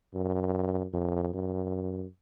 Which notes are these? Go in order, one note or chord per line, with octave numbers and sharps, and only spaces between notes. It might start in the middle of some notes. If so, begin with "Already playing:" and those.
F#2
F2
F#2